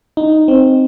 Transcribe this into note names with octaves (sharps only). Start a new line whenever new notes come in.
D#4
C4